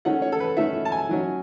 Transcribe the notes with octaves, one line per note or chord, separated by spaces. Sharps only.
D#3 A3 C#4 F#5
C#5
A4
B4
D#3 A3 C#4 E5
A5
G#5
D#3 F#3 C#4